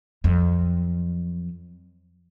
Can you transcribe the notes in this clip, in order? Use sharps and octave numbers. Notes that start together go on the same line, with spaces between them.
F2 F#3